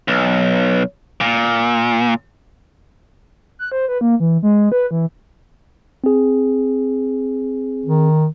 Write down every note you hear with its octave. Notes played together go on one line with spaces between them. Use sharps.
B1
A#2
F#6
C5
B4
A#3
E3
G#3
B4
E3
C4 G#4
D#3